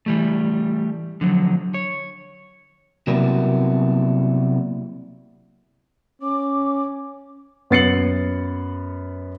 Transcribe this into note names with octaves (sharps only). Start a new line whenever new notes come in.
E3 G3 A3
D3 F3 F#3
C#5
C3 F#3 G3 A#3 B3 E4
C#4 D6
F#2 B3 A6 C7 C#7 F#7